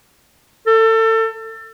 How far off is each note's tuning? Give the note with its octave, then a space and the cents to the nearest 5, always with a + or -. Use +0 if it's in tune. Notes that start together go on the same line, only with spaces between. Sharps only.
A4 +30